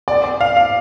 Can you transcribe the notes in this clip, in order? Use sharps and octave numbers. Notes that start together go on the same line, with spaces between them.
D5
D5
F5
F5